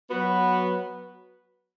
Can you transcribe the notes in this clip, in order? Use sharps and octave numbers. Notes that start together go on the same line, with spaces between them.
F#3 B3 F#4 B4